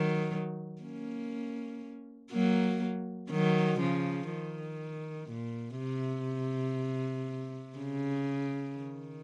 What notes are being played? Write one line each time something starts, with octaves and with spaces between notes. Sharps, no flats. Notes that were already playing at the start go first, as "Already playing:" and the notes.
Already playing: D#3 F#3
A#3 C#4
F#3 A#3
D#3 F#3
C#3 F3
D#3
A#2
C3
C#3
D#3